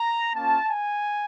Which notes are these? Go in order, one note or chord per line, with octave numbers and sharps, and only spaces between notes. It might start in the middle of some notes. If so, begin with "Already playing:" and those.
Already playing: A#5
A#3 C#4 F4 A5
G#5